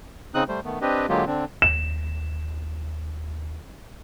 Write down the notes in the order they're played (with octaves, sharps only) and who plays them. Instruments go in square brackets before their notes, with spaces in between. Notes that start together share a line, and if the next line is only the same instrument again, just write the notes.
[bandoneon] C#3 C4 D#4 D#6 F#6
G3 A3 C5
D#3 A3 B3
C4 D4 G4 B4 D#5
D3 F#3 G#3 A#3 F4 G4
D3 C4 D4
[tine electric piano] D#2 [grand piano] E7